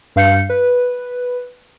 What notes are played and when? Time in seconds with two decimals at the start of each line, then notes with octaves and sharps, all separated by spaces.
0.16 G2 F5 G6 C#7
0.49 B4